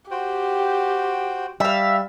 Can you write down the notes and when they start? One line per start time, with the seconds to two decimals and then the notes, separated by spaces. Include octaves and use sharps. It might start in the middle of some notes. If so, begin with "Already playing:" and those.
0.11 F#4 G4 C5 G5
1.60 G3 E5 F5